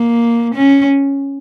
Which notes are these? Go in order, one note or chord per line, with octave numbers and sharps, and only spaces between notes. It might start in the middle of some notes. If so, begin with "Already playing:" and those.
Already playing: A#3
C#4